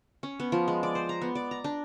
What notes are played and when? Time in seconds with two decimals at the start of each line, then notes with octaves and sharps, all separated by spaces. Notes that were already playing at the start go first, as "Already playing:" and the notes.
0.23 C#4
0.40 B3
0.52 F3
0.68 G#3
0.83 D5
0.95 C5
1.09 A#5
1.21 B3
1.35 D5
1.51 A#5
1.64 D4